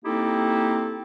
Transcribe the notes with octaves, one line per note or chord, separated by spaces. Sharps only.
A#3 C4 D#4 E4 G4 A4